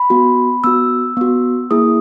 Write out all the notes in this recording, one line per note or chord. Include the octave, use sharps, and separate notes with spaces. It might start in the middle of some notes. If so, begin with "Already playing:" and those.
Already playing: B5
B3 F#4
B3 F#4 E6
B3 F#4
A#3 E4 G#4 D#6